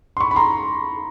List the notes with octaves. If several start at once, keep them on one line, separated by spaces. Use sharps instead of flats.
C6
B5 C#6
B5
A#5 C6